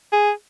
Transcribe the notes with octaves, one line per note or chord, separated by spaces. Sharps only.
G#4